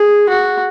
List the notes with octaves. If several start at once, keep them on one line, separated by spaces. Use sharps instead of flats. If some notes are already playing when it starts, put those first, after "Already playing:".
Already playing: G#4
F#4